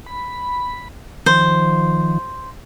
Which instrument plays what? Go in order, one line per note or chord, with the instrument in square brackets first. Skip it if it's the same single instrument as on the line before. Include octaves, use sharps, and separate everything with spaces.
[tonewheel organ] B5
[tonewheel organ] D#3 F3 [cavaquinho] C5